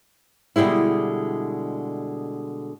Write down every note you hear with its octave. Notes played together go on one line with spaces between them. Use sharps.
B2 D3 G3 G#3 E4